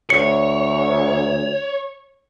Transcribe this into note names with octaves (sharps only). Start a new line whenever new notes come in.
D2 C#5 C#7